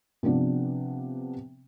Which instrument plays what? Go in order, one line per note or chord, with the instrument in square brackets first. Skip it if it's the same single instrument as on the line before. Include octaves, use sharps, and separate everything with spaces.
[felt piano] C3 F3 B3 D4